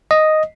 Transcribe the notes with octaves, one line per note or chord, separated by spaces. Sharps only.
D#5